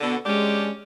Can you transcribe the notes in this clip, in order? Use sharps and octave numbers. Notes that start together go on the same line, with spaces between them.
B2 D3 B3
G#3 C#4 D4 G4